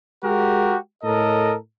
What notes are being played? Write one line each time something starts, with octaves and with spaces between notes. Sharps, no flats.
G#3 F#4 G4 A#4
A2 A4 A#4 D#5